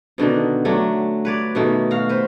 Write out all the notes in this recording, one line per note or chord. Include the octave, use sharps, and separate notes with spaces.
B2 D3 D#3 D4
F#3 A3 D4
B4 C#5 D5
B2 D#3 A3
F#4 F5
B4 C5